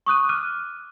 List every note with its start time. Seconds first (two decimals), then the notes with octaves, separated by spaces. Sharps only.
0.06 C#6 D#6 F#6 D#7
0.29 D6 F6 F#6 D#7